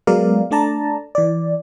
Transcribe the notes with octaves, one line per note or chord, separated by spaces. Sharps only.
F#3 G#3 B3 A#4 D5 F5
A3 D4 D5 A5 A#5
E3 D5